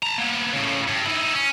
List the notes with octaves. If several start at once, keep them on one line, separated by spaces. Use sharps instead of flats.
A5 A#5
A#3 B3
A2 C#3
G2
D#4 E4
C#4